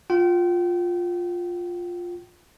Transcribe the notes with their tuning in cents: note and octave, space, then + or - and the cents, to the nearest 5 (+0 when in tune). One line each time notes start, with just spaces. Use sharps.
F4 +10 G5 -35